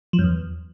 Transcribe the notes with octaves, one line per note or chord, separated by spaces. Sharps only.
F3
F#2
E2